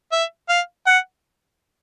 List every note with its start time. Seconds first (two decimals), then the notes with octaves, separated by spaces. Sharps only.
0.12 E5
0.49 F5
0.87 F#5